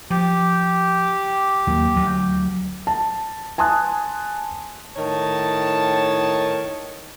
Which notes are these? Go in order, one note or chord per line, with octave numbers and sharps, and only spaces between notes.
F3 G4
D#2 F#3 A#3
D2 F#3
A5
G#5 A5 C6 D#6 F#6
A2 D#3 C#5 A5